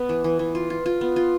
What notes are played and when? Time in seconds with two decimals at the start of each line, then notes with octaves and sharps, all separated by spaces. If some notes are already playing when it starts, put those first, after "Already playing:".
Already playing: B3
0.09 E3
0.24 E3
0.39 E3
0.55 F4
0.70 F4
0.86 F4
1.01 B3
1.16 F4